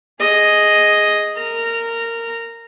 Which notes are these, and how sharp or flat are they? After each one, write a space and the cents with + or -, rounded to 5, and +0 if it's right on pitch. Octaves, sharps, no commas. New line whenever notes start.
G#4 +0 D#5 +0
A#4 -20 A#5 -10